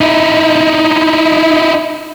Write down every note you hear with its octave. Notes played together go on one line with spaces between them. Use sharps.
D#4 E4